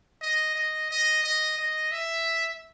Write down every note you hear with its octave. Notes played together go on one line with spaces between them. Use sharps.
D#5
D#5
D#5
D#5
D#5
E5